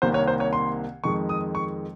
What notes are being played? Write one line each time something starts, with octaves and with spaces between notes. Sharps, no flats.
C2 C3 D#3 A#3 C5
C#5
C5
C#5
C6
F2 D#3 G#3 C#6
D#6
C#6